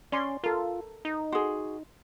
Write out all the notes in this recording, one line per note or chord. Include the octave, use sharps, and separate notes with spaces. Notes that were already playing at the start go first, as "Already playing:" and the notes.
C#4 D5 G#5 C6
F4 A4 A#4
D#4
F#4 G#4 C6